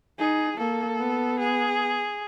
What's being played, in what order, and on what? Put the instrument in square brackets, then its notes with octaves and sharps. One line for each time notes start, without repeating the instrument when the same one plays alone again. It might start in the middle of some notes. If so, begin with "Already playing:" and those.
[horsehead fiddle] D#4 [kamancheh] G#4
[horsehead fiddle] A#3 [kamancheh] A4
[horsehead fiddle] B3
[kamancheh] G#4